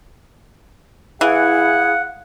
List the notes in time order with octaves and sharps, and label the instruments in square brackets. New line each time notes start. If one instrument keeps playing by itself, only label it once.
[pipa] E3 [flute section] E4 G#4 [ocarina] F5 [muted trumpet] F#5